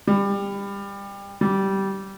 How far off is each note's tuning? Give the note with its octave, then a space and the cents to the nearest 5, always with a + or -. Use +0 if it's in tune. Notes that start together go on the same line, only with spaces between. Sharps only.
G3 +25
G3 -15